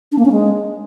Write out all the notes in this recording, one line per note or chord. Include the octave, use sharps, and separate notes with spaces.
D4
A#3
C#4
G#3